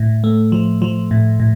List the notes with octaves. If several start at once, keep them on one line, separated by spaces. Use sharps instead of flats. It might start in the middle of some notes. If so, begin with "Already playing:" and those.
Already playing: A2
A3
F3
F3
A2
A2